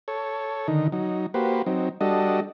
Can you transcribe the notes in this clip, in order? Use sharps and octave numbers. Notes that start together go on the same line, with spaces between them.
A4 C#5
D3 D#3 D#4
F#3 D#4
A#3 F#4 G4 B4 C5
F#3 C4 D#4
G3 D4 F#4 A4 D#5